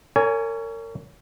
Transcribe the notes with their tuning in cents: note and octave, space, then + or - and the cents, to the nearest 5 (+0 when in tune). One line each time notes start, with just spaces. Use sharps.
A#4 -35 C#5 +25 G#5 +0